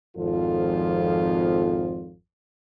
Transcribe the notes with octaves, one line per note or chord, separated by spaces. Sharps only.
G#1 F2 F3 F4 A4